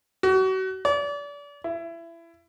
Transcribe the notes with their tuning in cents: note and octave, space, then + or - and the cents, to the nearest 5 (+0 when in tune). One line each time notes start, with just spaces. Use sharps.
F#4 +35
D5 -35
E4 +25